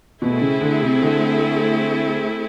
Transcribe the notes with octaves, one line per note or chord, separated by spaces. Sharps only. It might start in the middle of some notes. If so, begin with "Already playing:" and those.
B2 A3 C4 E4 G#4
C#3
D3
C3
D3